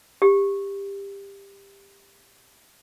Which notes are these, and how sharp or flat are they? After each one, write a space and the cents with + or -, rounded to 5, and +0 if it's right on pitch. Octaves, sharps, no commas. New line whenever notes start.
G4 +20